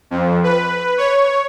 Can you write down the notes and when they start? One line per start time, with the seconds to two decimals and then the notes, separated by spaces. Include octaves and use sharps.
0.11 F2
0.43 B4
0.98 C#5